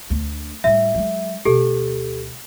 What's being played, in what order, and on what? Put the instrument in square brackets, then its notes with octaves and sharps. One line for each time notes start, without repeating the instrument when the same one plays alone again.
[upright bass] D2 D3
[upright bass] A2 G3 [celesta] E5
[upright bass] F#3 G#3
[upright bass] D2 B2 [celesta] G4 A4